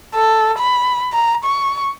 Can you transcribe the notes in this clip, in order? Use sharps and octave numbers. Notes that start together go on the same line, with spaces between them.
A4
B5
A#5
C#6